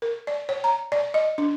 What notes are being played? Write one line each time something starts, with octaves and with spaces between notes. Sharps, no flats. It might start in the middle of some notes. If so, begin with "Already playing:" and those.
A#4
D5
C#5
A#5
D5
D#5
D4